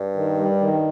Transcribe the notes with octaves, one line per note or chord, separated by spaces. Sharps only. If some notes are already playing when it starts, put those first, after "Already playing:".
Already playing: G2
D#3
G3
D#3